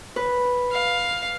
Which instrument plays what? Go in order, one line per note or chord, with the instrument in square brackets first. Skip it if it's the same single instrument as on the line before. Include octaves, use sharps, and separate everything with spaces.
[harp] B4
[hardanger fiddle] F5